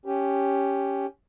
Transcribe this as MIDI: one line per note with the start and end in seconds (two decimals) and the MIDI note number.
0.06 1.06 61
0.06 1.06 67